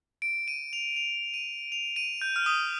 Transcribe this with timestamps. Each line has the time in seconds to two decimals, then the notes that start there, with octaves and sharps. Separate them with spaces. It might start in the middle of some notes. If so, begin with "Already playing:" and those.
0.22 D7
0.48 D#7
0.73 F7
0.96 F7
1.34 D#7
1.72 F7
1.96 D#7
2.21 G6
2.36 F6
2.46 D#6